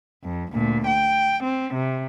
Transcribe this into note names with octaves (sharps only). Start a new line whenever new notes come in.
F2
D2 A#2
G5
C4
C3